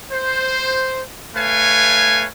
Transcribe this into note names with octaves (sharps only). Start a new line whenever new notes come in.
C5
A3 B4 C#5 F5 G#5